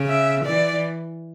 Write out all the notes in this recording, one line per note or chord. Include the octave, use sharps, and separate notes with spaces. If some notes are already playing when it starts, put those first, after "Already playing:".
Already playing: C#3
E5
E3 D5